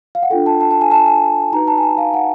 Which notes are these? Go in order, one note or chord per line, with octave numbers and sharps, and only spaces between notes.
F5
F#5
D4 F4 A4 G5
A5
A5
A5
G#5
A5
G#5
D#4 F#4 B4 A#5
A5
G#5
A5
F5
F#5